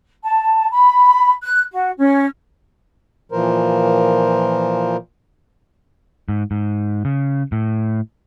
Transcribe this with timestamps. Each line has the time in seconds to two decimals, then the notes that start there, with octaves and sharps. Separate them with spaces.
0.24 A5
0.72 B5
1.42 F#6
1.72 F#4
1.97 C#4
3.32 A#2 E3 F3 A#4 C5
6.29 G#2
6.51 G#2
7.05 C#3
7.52 A2